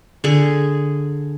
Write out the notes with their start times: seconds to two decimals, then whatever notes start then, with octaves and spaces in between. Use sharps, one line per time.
0.24 D3 G#4